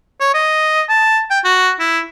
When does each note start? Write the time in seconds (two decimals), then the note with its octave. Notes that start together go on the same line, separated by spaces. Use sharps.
0.20 C#5
0.34 D#5
0.89 A5
1.30 G5
1.44 F#4
1.79 E4